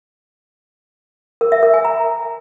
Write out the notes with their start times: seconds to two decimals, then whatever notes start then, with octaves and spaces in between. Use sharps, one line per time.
1.41 A#4
1.52 E5
1.63 A#4
1.74 G#5
1.85 A#5